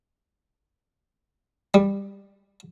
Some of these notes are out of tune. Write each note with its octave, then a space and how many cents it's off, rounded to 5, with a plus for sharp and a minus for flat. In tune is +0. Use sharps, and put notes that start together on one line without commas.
G3 +15